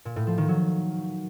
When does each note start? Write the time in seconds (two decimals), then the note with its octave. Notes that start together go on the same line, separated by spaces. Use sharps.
0.05 A#2
0.16 A2
0.27 F3
0.38 D#3
0.48 F#3